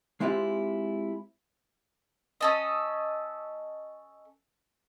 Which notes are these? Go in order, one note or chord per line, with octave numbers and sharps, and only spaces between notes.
G#3 C4 E4 F4 G4
C#4 A4 D#5